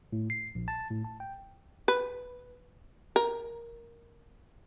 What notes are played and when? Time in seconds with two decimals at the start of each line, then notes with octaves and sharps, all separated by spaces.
0.13 A2
0.30 C7
0.55 A#1
0.68 A5
0.90 A2
1.05 A5
1.20 G5
1.88 B4
3.16 A#4